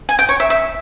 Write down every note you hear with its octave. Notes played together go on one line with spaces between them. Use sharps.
G#5
G5
C#5
E5
E5